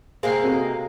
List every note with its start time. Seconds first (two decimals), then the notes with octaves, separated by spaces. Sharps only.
0.23 C3 G#3 A#3 G#4 C5 C7
0.44 C4 F#4 A4